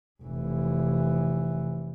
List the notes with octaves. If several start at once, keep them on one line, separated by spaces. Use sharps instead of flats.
F1 E3